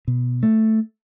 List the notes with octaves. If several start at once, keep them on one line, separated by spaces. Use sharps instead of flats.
B2
A3